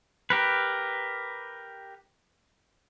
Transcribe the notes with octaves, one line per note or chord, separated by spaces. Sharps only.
G4 A#4 B4